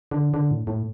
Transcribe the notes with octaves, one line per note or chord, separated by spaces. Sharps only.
D3
D3
A2
A2